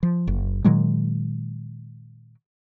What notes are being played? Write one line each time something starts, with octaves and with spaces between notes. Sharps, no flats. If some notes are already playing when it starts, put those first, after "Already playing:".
F3
F#1
A#2 D#3 F#3 G#3